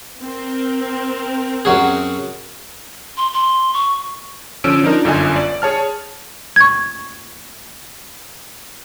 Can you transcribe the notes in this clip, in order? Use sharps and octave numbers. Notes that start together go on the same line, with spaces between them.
C4 A#4
F#2 F#3 G#4
C6
C6
C#6
D3 F3 C#4 E6 D7
F3 D4 D#4 A#4
G1 F#2 D3 F4 D#5 G#5
D5
G#4 C#5 A5 F6
C#6 G#6